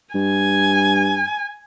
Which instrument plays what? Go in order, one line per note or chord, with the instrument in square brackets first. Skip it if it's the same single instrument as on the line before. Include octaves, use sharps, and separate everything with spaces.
[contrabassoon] G2 [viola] G#5